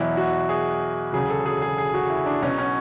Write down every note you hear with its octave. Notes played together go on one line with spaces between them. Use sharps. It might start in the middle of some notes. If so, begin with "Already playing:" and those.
Already playing: E2 B2 F#3 E4
F#4
G#4
E1 D2 C#3 F#3 G#4
A4
G#4
G#4
G#4
F#4
E4
D4
B1 B2 F#3 C#4
C#4